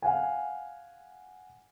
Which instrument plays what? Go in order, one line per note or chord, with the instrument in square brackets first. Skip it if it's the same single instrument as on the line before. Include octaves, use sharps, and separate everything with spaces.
[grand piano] F5 F#5 G#5